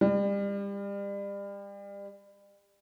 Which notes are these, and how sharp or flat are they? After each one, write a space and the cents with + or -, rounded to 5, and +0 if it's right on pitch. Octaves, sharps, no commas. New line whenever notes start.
G3 +35